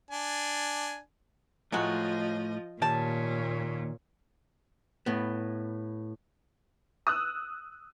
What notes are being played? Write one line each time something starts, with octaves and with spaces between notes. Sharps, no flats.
D4 G#5
A2 F3 F#3 G#3 A3 F#4 D#5
D#2 A#2 C#4 G4 A5
A2 B3
D#6 E6 F#6